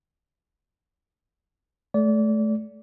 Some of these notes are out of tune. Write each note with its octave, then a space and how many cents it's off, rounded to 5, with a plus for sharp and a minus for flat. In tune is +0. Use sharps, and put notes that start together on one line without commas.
A3 -25 D5 -30